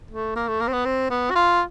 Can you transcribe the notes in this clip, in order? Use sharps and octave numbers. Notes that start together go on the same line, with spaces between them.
A3
A#3
A3
A#3
C4
B3
C4
B3
F#4
F4